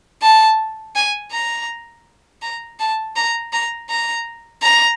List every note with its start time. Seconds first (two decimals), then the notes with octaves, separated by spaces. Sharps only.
0.22 A5
0.96 G#5
1.32 A#5
2.42 A#5
2.80 A5
3.16 A#5
3.53 A#5
3.90 A#5
4.62 A#5